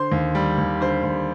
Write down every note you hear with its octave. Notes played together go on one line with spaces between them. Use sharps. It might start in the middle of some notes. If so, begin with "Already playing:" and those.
Already playing: D3 C5 C6
D#2
G3
D#2
D3 C5 C6
D#2